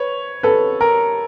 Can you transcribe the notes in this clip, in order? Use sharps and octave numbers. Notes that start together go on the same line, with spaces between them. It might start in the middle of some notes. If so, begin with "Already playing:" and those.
Already playing: B4 C#5
A4 B4
A#4